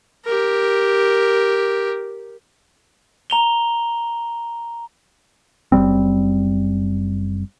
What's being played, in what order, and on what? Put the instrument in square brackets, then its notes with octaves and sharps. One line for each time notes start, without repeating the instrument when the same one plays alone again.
[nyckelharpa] G4 A#4
[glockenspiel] A#5 F7 G7
[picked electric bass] F#1 F2 G3 C4